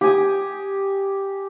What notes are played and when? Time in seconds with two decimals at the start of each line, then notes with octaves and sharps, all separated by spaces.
0.01 G4 G#5 D#6